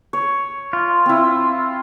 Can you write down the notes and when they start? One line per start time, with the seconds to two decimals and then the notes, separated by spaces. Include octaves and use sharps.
0.13 C#5
0.73 F4
1.06 C4 E4